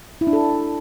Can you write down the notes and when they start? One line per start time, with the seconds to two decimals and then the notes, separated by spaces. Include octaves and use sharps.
0.21 E4
0.27 D4
0.33 A4